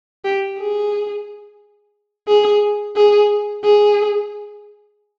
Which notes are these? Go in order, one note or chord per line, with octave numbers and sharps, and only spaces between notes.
G4
G#4
G#4
G#4
G#4